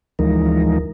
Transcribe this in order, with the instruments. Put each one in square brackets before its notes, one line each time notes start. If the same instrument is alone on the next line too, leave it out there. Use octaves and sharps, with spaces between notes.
[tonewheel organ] D2 E3 F3 G#3 D#4 A#4